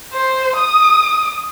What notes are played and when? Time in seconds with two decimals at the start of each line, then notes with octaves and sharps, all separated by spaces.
0.13 C5
0.56 D#6